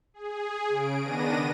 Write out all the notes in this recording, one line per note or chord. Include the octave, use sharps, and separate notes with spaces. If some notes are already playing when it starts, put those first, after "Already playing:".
G#4
C#3 D7
D#3 B3 D4 A#6 D#7